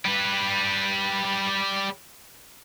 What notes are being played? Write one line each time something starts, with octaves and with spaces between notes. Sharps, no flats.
G3 B4